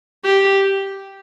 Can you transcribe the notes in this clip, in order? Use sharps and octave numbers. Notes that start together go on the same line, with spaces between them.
G4